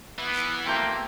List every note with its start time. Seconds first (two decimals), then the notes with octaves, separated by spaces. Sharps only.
0.19 E3 B3
0.66 B2 A3 A#3 C4 A#4 G5